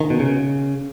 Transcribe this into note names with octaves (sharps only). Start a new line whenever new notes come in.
D#3
B2
C#3